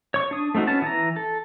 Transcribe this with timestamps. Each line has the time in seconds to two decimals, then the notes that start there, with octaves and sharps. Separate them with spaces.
0.14 C#5 C#6
0.31 D4 D#6
0.55 A3 C4 D#4 F#4
0.67 B3 C#4 A5
0.82 E3 A#5
1.16 A4